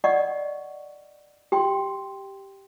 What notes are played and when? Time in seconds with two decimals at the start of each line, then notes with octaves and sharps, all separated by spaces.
0.04 D5 D#5 F#5 C#6
1.52 G4 G5 C6